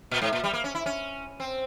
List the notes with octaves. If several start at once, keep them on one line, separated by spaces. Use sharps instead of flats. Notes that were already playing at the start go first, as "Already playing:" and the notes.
A#2
G#2
A#2
G3
A#3
C#4
E4
C#4
C4